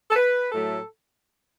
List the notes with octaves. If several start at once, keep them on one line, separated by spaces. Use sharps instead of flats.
A4
B4
A2 F#3 A3 A4